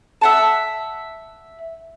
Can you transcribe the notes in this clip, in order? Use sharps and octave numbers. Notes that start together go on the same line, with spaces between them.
E5 F#5 A5